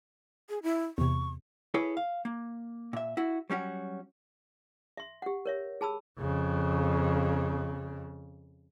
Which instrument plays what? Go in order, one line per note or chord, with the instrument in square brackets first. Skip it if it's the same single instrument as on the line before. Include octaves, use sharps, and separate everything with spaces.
[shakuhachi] G#4
E4
[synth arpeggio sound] E2 C3 [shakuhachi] C#6
[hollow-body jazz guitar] E4 G#4 A4 B4 C#5
F5
A#3
A#2 E5
E4 F#4
F#3 G3 C#4 F#4
[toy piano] E5 C6
G4 F#5
A#4 C#5 E5
G#4 A5 B5 E6
[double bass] F2 C#3